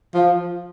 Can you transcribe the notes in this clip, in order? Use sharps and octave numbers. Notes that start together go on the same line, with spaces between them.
F3